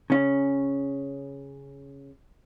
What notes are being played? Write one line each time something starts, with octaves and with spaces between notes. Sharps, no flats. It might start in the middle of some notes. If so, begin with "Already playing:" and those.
C#3 C#4